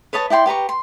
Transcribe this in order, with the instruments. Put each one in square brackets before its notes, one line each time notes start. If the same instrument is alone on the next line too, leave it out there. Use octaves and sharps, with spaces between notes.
[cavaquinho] B4 C#5 D#5 A5
E4 D5 G5 C6
G4 B4 A#5 C#6
C6